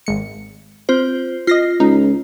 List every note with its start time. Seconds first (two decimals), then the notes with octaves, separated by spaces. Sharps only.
0.07 G#1 G#3 C#7
0.89 C4 F4 C5
1.47 F4 D#5 A#6 C7
1.80 C#2 D#4